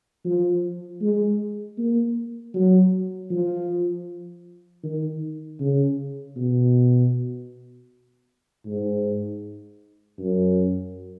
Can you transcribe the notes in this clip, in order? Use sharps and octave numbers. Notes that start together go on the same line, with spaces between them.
F3
G#3
A#3
F#3
F3
D#3
C#3
B2
G#2
F#2